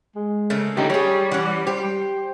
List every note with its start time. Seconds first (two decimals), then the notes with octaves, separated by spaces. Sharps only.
0.15 G#3
0.50 C#3 A3 A#3
0.77 D3 A3 C#4 D#4 G4
0.90 G3 G4 G#4 C#5
1.31 E3 C#4 F#5
1.67 G4 C5